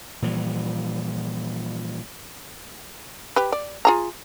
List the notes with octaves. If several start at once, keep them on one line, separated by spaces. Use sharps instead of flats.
A#2 E3 F3 G3
G4 B4
D5
F4 G#4 A#5